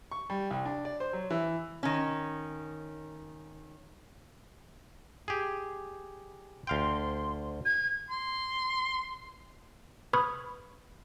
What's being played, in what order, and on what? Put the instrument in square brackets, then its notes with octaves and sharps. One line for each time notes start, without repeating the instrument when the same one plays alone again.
[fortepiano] C#6
G3
C2
D4
D5
C5
F#3
E3
[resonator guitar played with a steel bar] D#3 C#4
[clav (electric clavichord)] G4 G#4
[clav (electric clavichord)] D2 F5 G5 [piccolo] C6
[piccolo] G#6
[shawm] C6
[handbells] B4 B5 C#6 D#6 F6 G#6